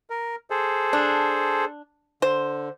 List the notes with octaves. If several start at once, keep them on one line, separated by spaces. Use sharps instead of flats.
A#4
G#4 A4 C5
D4
D3 C5